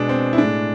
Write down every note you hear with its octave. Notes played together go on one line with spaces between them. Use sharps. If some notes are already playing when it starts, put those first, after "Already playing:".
Already playing: B2 G#3 D4
C4
E4
A2 G#3 D4